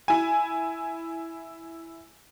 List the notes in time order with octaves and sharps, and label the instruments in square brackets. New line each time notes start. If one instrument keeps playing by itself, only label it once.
[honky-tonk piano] E4 G#5